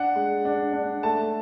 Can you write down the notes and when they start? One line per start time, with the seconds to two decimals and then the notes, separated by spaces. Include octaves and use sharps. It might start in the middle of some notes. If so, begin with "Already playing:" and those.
Already playing: D4 F#5
0.15 G#3
0.45 D4
0.73 D4
1.03 A3 A5